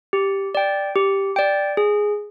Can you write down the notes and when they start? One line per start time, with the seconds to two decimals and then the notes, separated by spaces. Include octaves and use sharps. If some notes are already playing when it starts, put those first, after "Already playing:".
0.13 G4
0.55 D5 G5
0.96 G4
1.36 D5 G5
1.77 G#4